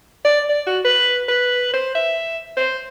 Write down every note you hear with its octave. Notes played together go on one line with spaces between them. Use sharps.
D5
D5
F#4
B4
B4
C5
E5
C5